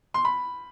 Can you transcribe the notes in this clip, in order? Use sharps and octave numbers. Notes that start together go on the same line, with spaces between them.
C6
B5